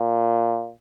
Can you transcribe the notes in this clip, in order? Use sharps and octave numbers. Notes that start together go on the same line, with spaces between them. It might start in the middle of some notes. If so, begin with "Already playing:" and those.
Already playing: A#2